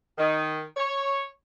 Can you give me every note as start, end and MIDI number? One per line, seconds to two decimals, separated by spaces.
0.18 0.60 51
0.76 1.23 73